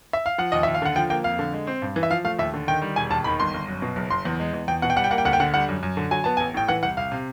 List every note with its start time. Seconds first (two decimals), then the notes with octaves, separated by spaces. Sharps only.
0.13 E5
0.26 F5
0.38 F3 F#5
0.52 D#2 D#5
0.63 D#2 E5
0.74 F5
0.82 D3 F#5
0.96 F3 G5
1.10 A#3 G5
1.24 F2 F5
1.39 D3
1.54 G#3
1.67 C4
1.82 G2
1.96 E3
2.03 E5
2.10 F3 F5
2.24 A3 F5
2.39 D#2 E5
2.54 D3
2.68 D#3 G5
2.82 G3
2.96 E1 G#5
3.10 D#2 A5
3.24 D#3 B5
3.40 G1 C6
3.54 G1
3.68 F#2
3.82 B2
3.96 F#1
4.10 F#1 C6
4.25 E2
4.40 G#3
4.54 E2
4.68 E2 G5
4.82 B2 F#5
4.90 G5
4.96 G3 F#5
5.04 G5
5.11 A#3 F#5
5.18 G5
5.25 D2 F#5
5.33 G5
5.40 D3 F#5
5.54 G3 F#5
5.68 F#2
5.83 F#2
5.97 D3
6.11 F#3 G#5
6.24 B3 A5
6.37 A1 G#5
6.54 A2 G5
6.68 E3 F#5
6.83 C2 F#5
6.97 C2 F5
7.12 C3